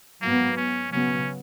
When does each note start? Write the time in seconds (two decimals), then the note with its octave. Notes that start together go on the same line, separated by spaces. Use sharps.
0.22 G#2 F#3 A#3 B3
0.57 C#4
0.93 C#3 F#3 B3 C#4